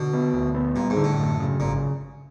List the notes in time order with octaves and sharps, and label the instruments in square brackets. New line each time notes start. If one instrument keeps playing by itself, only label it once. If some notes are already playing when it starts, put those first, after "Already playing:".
Already playing: [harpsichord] B2 [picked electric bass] D3
[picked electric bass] B3
D2
B3
[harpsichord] A#2 [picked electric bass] G3
[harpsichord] G#2
[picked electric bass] D3
[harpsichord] A2
[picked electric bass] F#2
C#3
[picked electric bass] G#1 [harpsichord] A#2